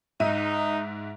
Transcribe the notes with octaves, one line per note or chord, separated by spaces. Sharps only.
G#2 D#4 E5 D#7